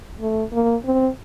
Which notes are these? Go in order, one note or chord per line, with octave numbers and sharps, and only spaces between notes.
A3
A#3
C4